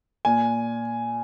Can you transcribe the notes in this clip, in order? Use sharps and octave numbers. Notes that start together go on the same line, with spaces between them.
A#2 G#5